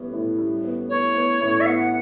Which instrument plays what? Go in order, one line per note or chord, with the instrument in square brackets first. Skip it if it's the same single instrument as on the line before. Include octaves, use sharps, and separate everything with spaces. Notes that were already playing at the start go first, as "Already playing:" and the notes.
Already playing: [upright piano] A2 G3 B3
A2
G3
B3
[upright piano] B3 [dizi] C#5
[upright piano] B3
A2
[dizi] E5
[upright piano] B3 [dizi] F#5